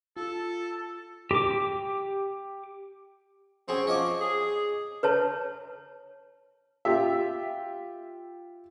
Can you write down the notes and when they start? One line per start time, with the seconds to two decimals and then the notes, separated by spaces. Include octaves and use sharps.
0.17 F4 A4
1.31 G4 D6
3.68 F#3 C4 C#4 G#4
3.87 F3 C#5 D#5 D6
4.21 G#4
5.03 B4 C#5 A5
6.85 F4 G4 E5